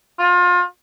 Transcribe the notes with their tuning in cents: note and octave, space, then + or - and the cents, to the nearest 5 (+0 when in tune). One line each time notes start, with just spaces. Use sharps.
F4 +30